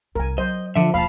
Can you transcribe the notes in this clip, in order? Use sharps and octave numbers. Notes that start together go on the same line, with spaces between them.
C2 D#3 A#4 G#5
F#3 C5 D#5
D3 F3 E5
E1 A#3 F5 A5 B5